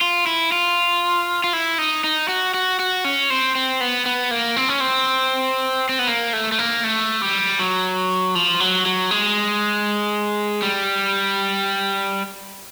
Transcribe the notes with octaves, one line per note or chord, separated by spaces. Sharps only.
F4
E4
F4
F4
E4
D#4
D#4
F#4
F#4
F#4
C#4
C4
C4
B3
B3
A#3
C4
C#4
C4
C4
B3
A#3
A3
A3
A#3
A3
G3
F#3
F3
F#3
F#3
G#3
G3